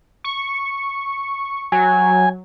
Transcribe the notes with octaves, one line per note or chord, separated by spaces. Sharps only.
C#6
F#3 G#5